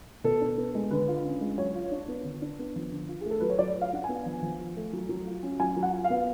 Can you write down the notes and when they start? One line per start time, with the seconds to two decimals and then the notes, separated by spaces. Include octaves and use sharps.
0.24 B2 A4
0.41 D4
0.58 B3
0.75 G#3
0.91 D3 B4
1.08 F4
1.24 C#4
1.41 G#3
1.57 F#3 C#5
1.75 F4
1.92 D4
2.08 B3
2.24 D3
2.42 D4
2.59 B3
2.76 F3
2.92 D3
3.09 F4
3.21 A3 G#4
3.30 A4
3.40 F#3 B4
3.50 C#5
3.59 F#3 D5
3.76 F4
3.81 F5
3.93 D4 F#5
4.04 B3 G#5
4.26 F3
4.42 F3
4.60 F4
4.76 A3
4.93 F#3
5.09 F#3
5.27 F4
5.43 C#4
5.60 F#3 G#5
5.77 F#3
5.83 F#5
5.93 F4
6.04 F5
6.10 B3